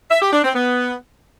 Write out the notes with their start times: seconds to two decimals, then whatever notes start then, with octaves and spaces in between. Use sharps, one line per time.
0.10 E5
0.21 G4
0.32 D4
0.43 C4
0.54 B3